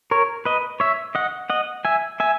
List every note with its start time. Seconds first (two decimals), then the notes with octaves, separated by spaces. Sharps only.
0.11 A#4 C#5
0.45 B4 D#5
0.80 C#5 E5
1.15 D#5 F#5
1.50 D#5 F#5
1.85 E5 G#5
2.20 E5 G#5